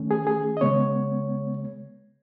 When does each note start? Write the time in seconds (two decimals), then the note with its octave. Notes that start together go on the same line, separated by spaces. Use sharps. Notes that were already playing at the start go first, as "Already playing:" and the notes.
Already playing: D#3 A3 C#4
0.11 G#4
0.27 G#4
0.57 D#5
0.61 C#3 G#3 B3 C#5